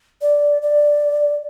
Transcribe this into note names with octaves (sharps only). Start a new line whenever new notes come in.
D5
D5